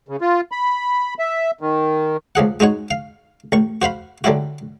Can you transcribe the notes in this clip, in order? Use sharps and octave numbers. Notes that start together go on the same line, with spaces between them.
C#3
F4
B5
E5
D#3
C#2 F3 G#4 F#5
G#3 D#4 F#4 C#5
F5
A1 C#6
F#4 C5 F5 B5
D3 F#3 G3 E4 F#4